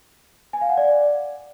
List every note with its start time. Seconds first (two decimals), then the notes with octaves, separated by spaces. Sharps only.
0.53 G#5
0.61 F5
0.69 F#5
0.77 D5